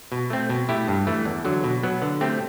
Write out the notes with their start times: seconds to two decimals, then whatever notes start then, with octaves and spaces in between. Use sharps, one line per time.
0.12 B2
0.30 A3 C4
0.49 B2
0.69 A3 E4 G4
0.88 G2
1.07 E3 A3
1.25 E2
1.45 D3 F#3
1.64 B2
1.83 F#3 B3
2.02 D3
2.21 A3 C4 G4